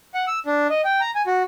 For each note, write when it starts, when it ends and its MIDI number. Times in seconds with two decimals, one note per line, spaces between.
0.14 0.25 78
0.27 0.39 88
0.46 0.67 62
0.70 0.81 75
0.85 1.01 79
1.01 1.11 82
1.15 1.22 80
1.27 1.43 66